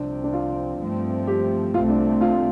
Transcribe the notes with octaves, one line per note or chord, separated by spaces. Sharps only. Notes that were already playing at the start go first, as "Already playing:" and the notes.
Already playing: C2 C3 F3 C4 D4
D4
F4
G2 F3 A3 C4
G4
C2 C3 A3 C4 F4
D4
F4